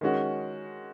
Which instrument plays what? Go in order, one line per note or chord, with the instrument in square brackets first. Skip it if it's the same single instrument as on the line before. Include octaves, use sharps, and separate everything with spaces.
[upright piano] D#3 G#3 C#4 F#4